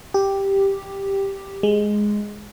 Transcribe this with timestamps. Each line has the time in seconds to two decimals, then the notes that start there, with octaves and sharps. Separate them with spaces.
0.14 G4
1.63 G#3